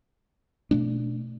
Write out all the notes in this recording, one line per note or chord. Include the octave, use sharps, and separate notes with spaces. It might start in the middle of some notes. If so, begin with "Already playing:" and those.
B2 A3 D4